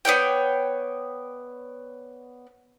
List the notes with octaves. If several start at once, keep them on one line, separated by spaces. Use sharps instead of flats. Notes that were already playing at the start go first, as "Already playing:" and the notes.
B3 C#5 D5 G5